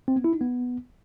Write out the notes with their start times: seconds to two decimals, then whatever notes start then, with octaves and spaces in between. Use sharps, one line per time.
0.08 C4
0.16 B3
0.24 E4
0.33 D#4
0.41 B3